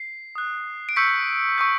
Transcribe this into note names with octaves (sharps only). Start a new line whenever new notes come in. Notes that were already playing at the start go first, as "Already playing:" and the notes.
Already playing: C7
D#6 F#6
D7
C#6 E6 G6 B6 C#7
C#6 E6 G6